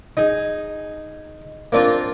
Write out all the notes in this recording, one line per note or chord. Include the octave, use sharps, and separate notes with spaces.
D#4 G#4
A#3 C4 D4 F4